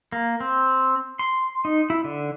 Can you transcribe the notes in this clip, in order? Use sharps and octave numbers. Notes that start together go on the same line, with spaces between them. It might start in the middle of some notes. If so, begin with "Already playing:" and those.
A#3
C4
C6
D#4
E4
D3